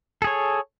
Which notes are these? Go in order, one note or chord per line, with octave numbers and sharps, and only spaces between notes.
G#4 A4 C#5